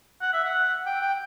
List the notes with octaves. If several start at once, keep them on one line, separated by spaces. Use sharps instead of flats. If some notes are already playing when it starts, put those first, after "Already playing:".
F#5
E5
F#5
G5
G5